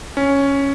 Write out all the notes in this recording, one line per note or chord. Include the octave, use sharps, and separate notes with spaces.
C#4